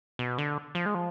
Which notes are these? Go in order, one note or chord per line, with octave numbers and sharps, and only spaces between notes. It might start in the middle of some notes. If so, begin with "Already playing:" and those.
B2
D3
F3
G#3
F3